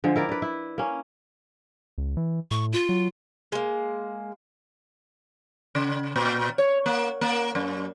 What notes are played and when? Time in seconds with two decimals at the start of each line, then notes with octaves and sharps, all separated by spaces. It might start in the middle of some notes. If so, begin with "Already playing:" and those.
0.04 D3 F3 G#3
0.16 E4 A#4 D5
0.29 B4 D5
0.42 E4
0.78 A#3 C#4
1.98 C#2
2.17 E3
2.51 A2 C#6
2.73 F4
2.89 F#3
3.52 G#3 A#3
5.75 C#3
6.16 A#2
6.58 C#5
6.86 A#3
7.21 A#3
7.55 F#2